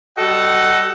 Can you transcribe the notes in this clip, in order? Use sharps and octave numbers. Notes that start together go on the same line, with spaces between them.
G3 F#4 A4 D#5 F#5